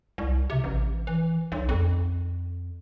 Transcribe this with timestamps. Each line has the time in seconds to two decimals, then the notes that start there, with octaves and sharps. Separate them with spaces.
0.18 C2
0.50 C3
0.64 A1
1.07 E3
1.52 B1
1.69 F2